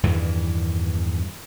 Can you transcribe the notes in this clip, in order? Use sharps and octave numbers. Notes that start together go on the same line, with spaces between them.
E2 G2 D#3 E3